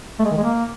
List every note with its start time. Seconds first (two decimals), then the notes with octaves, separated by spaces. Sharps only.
0.19 A3
0.25 G#3
0.31 D#3
0.37 G#3
0.43 A#3